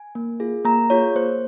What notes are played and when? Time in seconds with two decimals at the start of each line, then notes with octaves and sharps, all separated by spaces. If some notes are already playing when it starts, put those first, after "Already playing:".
Already playing: G#5
0.15 A#3
0.40 F4 G#4
0.65 A#3 A#5
0.90 F4 G#4 C#5
1.15 A#3 C5